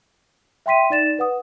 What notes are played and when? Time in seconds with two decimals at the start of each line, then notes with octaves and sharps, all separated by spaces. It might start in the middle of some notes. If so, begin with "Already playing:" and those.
0.66 E5 G5 C6 B6 D#7
0.90 D#4 D5 A6 E7
1.19 B4 F#5 D#6